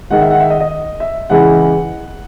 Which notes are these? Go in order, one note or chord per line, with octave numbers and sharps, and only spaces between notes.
D#3 G#3 F#5
E5
F#5
E5
D#5
D#5
E5
C#3 E3 G#3 F#5